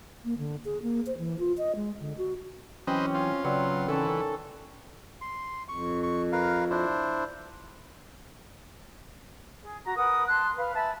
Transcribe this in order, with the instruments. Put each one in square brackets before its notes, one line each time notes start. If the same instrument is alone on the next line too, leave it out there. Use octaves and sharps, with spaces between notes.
[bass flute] A#3
D3
G#4
A#3
C5
E3
F4
D#5
G#3
D3
F#4
[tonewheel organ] E3 F#3 [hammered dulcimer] C4 G4 [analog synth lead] C#4 [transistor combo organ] B4 C5 D#5
[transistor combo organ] F4
[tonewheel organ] C#3 B4 F#5 [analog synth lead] F#3 [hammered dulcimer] C4 D5
[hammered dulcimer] D#3 C#4 A5 [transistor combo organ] E3 [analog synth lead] A4
[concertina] C6
[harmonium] F2 [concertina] C#6
[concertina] C#6
A#4 B4 F5
D4 E4 C5
[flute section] G#4
F#4 A#5
A#4 B4 F#5 D#6
A5 C6 F#6
B4 F5
E5 G#5 A5 B5